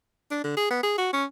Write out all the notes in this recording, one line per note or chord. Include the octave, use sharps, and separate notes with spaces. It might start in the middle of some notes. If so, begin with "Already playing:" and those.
D4
D3
G#4
B3
G#4
F#4
C#4